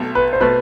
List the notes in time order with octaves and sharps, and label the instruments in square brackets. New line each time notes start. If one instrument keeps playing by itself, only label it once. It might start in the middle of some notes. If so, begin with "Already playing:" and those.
Already playing: [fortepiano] B1 B2 A3
[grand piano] B4
C5
[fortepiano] B2 A3 [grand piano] B4